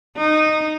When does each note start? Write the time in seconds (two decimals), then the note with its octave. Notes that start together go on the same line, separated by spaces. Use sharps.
0.17 D#4